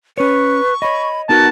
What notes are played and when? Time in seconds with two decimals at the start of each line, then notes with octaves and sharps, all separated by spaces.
0.18 C#4 B4 C#5 C#6
0.82 C#5 D#5 B5
1.29 B3 D#4 F#4 A#4 A5